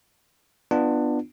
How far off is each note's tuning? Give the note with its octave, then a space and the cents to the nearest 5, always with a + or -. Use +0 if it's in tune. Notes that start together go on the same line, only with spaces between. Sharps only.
B3 +0 D4 +20 F4 -5